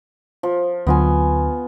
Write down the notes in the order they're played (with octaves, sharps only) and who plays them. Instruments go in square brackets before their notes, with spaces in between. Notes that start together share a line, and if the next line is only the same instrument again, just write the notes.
[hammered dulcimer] F3
[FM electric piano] D2 D3 F#3 [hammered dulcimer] B3 F4 G#5